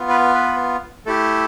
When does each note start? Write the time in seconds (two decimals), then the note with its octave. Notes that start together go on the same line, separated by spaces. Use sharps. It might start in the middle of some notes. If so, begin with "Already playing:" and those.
Already playing: B3 F4
0.09 B4
0.34 B4
1.06 A3 E4 G4 A4